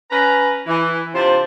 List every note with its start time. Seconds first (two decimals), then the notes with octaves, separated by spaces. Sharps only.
0.10 C#4 B4 A#5
0.66 E3
1.14 C3 D4 F4 C5